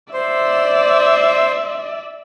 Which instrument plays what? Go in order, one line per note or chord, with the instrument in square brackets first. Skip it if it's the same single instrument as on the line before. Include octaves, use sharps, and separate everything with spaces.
[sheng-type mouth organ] C5 [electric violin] D5 E5